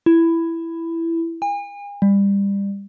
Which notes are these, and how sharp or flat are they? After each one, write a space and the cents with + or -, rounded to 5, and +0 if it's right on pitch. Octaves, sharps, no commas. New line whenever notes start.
E4 +10
G#5 -40
G3 +25